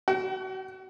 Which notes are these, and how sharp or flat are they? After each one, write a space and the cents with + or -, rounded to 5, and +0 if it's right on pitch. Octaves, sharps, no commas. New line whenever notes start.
F#4 +30 G5 -40